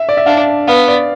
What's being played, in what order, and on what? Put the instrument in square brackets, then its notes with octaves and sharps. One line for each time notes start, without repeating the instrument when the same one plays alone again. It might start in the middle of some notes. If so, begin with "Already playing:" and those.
Already playing: [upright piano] E5
D5
E5
[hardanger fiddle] D4 [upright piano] F5
[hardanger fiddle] B3 [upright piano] F5
[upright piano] D5